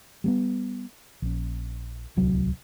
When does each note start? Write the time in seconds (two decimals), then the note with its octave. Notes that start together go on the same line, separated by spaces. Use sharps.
0.24 G3 A3 B3
1.22 A#1 C#4
2.17 D1 C2 F#3